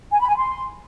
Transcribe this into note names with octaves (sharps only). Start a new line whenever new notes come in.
G#5
B5
G#5
C6